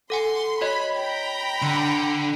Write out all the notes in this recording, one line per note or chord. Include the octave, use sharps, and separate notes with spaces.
A4 F#5 G#5 C6
F#4 C#5 D#5 B5
G5 A#5 B5
D3 C6